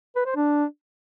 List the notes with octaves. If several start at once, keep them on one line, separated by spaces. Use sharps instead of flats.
B4
C5
D4